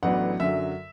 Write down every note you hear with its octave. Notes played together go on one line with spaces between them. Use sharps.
A1 A2 F#3 B3 D4 F#5
F#2 D3 F#3 E5